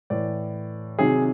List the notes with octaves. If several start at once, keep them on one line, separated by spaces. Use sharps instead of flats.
A2 E3 D5
C3 D#3 F#3 G#4